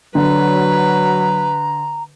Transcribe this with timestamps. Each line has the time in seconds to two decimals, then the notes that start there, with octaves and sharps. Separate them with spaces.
0.15 D3 F#3 B4 A#5